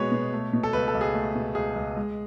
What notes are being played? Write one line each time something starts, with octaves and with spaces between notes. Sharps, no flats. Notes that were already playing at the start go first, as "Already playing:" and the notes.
Already playing: B2 G#3 B3 F#4 G#4 B4 C#5
B2
A3
B2
A4
C#2 B4
A4
C#2
G#4
A3
B2
C#2 G#4
C#2
G#3